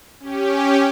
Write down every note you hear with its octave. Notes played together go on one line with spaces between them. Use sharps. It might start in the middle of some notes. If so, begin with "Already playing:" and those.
C#4 G4